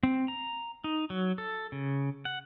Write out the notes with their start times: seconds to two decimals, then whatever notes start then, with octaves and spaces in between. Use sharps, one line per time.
0.03 C4
0.28 A#5
0.84 D#4
1.10 F#3
1.38 A4
1.72 C#3
2.25 F#5